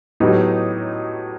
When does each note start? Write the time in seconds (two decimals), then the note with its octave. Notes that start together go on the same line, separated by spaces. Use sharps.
0.20 A2 F#3 B3 D#4 G4